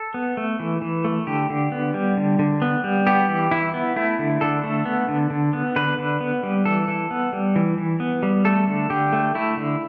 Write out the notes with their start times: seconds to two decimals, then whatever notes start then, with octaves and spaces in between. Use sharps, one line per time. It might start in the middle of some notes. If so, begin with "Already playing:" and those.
Already playing: A4
0.14 B3
0.37 A3
0.60 E3
0.82 E3
1.05 A3
1.27 D3 G4
1.50 D3
1.72 B3
1.94 G3
2.17 D3
2.39 D3
2.62 B3
2.84 G3
3.07 B3 G4
3.29 E3
3.51 E3 E4
3.74 B3
3.96 A3 E4
4.19 D3
4.41 D3 A4
4.64 A3
4.86 B3
5.08 D3
5.30 D3
5.53 B3
5.76 D3 B4
5.98 D3
6.20 B3
6.43 G3
6.65 E3 A4
6.88 E3
7.11 B3
7.33 G3
7.56 E3
7.78 E3
8.00 B3
8.23 G3
8.45 A3 A4
8.68 D3
8.90 D3 G4
9.13 A3
9.35 A3 E4
9.57 D3